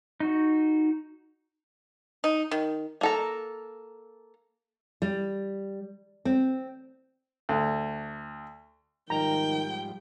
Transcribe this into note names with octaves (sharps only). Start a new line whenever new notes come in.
D#4 F#4
D#4
D#3
A#3 A4 A#5
G3
C4
D2
G#2 D#3 F3 G3 G5 A#5